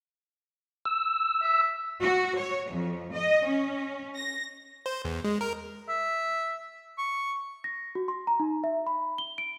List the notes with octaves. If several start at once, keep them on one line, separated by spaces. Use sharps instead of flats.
E6
E5
F#4
C#5
F2
D#5
C#4
A#6
C5
E2
G#3
A#4
E5
C#6
A#6
F#4
C6
A#5
D#4
E5
B5
G7
D7